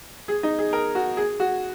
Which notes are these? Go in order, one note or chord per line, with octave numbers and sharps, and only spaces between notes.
G#4
D#4
G#4
A#4
F#4
G#4
F#4